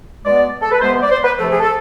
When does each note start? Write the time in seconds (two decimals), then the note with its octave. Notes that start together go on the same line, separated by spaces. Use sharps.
0.25 B2 G#3 B3 D5
0.62 A4
0.72 B4
0.81 C3 G#3 B3 C5
1.02 D5
1.11 C5
1.24 B4
1.38 C3 F3 A3 A4
1.49 G#4
1.60 A4